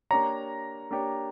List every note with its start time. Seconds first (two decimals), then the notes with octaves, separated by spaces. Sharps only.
0.11 A#3 D4 G4 C#5 A#5
0.91 A#3 D4 G4 C#5